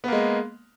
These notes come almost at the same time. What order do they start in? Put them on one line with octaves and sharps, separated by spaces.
B3 A#3 G#3